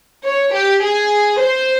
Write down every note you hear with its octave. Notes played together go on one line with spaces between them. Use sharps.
C#5
G4
G#4
C5